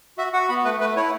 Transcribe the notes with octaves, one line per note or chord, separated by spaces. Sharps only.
F#4 E5
F#4 F#5
B3 B5
A3 B4
A3 B4
E4 C#5